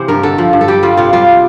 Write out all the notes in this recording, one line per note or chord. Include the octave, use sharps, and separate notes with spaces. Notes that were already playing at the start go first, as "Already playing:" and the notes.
Already playing: C3 E3 C5
G2 A#4
D3 A4
F3
G2
A4
G3 G4
G3 F4
C3 F4
G3 F4